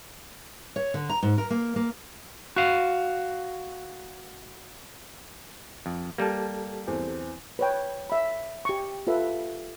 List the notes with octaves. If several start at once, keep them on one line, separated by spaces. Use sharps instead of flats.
C#5
D3
A#5
G#2
A#4
A#3
A#3
F#4 F5
F2
G3 A#3 G4 A4 A5
E2 C4
B4 C#5 G5
E5 B5
G4 C#6
F4 A4 B4 E5 F5